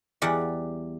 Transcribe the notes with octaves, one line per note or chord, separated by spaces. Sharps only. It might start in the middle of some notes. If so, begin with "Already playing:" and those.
E2 G3 G4 D5 F#5